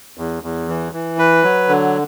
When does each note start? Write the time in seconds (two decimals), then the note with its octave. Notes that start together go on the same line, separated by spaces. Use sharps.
0.18 E2
0.43 E2
0.68 E3
0.93 E3
1.18 B4
1.43 F#3
1.69 D3